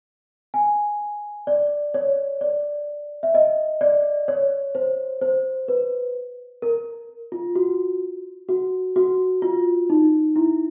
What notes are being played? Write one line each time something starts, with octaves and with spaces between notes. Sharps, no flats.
G#5
D5
C#5
D5
E5
D#5
D5
C#5
C5
C5
B4
A#4
F4
F#4
F#4
F#4
F4
D#4
E4